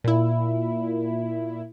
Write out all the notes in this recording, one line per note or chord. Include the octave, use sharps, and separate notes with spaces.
A#2 E4